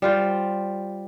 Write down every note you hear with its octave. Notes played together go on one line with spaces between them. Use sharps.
G3 F4 C5